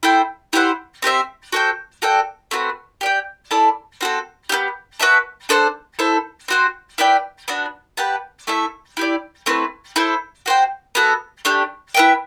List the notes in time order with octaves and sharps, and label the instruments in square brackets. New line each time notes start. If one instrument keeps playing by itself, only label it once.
[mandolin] E4 A4 C5 G5
E4 G4 C5 F#5
C4 G4 C5 E5
F#4 A4 C5 G5
F#4 A4 D5 G5
A3 C4 F#4 B4
G4 D5 G5
E4 A4 D5 A5
C4 F#4 A4
B3 E4 G4
F#4 B4 E5 A5
D4 A4 C5 F#5
E4 A4 C5
C4 F#4 C5
E4 B4 D5 G5
B3 D4 F#4
G4 B4 F#5 A5
A3 E4 A4 E5
E4 G4 D5
A3 C4 E4 B4
E4 A4 C5
F#4 C5 G5
B3 F#4 A4
A3 D4 G4
E4 B4 E5 G5